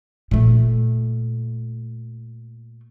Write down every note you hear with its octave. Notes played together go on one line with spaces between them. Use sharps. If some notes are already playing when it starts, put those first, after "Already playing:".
A#2 A3